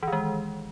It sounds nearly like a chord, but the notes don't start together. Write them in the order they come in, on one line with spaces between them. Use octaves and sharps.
E3 D#3 G#3